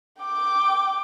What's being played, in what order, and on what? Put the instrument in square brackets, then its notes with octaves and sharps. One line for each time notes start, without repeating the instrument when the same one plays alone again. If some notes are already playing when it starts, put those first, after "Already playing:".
[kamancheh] G5 D6